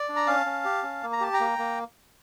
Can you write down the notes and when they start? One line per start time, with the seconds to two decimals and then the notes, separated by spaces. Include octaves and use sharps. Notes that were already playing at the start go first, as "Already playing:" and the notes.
Already playing: D5
0.09 D4
0.16 A#5
0.27 C#4 F5 A5
0.46 C#4
0.65 G4
0.83 C#4
1.03 A#3
1.13 A#5
1.21 G4 A5
1.34 G5 A#5
1.40 A#3
1.58 A#3